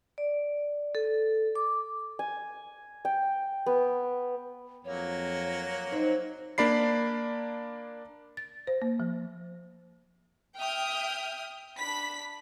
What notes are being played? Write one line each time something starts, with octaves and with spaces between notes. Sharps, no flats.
D5
A4
D6
G#5
G5
B3
F2 F#3 A#3 C#5
C4 D#4
A#3 D4 D5 B5 C7
A6
C5
A#3
F3
E5 G5 D#6 F6
D4 B5 B6